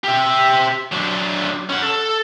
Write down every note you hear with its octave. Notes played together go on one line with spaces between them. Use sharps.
G4 E5
F#3 D4
C#4 F#5
A4